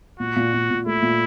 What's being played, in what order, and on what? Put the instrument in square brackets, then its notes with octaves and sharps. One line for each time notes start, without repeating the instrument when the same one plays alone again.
[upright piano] A#2 [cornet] F#4
[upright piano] A#2
A#2
A#2
[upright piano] A3 [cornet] E4
[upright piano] A#2